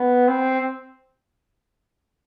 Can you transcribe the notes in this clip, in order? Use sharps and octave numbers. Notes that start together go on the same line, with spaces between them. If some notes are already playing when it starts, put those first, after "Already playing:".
Already playing: B3
C4